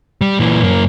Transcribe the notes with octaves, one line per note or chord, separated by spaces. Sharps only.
G3
A#2 E3
F#2 A#3